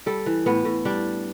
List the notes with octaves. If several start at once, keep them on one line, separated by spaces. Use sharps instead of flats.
G3 A4
E3
A2 B3
A2
G3 D4